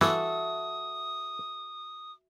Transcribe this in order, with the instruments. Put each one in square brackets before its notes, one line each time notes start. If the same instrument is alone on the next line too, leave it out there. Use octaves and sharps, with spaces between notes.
[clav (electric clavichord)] E3 [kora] F#4 A4 [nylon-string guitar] E5 [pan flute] D#6